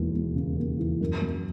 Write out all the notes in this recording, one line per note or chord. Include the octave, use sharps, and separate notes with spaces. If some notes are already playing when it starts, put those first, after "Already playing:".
Already playing: E1 D#2 E3
E1
C#3
D#2
E3
F#2
F#3